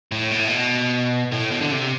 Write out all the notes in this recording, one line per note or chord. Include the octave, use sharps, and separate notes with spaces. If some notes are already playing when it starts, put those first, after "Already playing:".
A2
B2
A2
B2
A2
B2
D3
C3